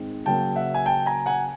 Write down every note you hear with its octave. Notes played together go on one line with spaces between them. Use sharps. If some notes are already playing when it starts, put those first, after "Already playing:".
Already playing: G#2 D#3 G#3 C4
C#3 F#3 A#3 G5 A5
E5 F#5
G#5
G5 A5
G#5 A#5
F#5 G#5